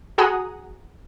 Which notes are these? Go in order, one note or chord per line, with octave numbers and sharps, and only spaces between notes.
F#4 G#4 F#5 G#5 A#5 D#6